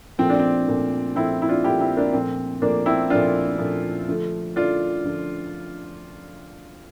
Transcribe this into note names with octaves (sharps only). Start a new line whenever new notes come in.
A#2 F3 A3 C4
D4
C4
A#2 F3 A3
A#2 F3 A3 C4 E4
E4
D4 F4
A#2 F3 A3 E4 G4
C4 E4
A#3 D4
A#2 F3 A3 C4
A#2 F3 A3 A#3 D4
C4 E4
A#2 F3 A3 D4 F4
A#2 F3 A3
D3 F3 A3
D3 F3 A3 D4 F4
D3 F3 A3